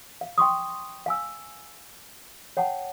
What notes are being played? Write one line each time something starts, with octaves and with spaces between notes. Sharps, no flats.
F5
G5 C6 C#6 D#6
F5 G#5 E6
C#5 F#5 G5 A5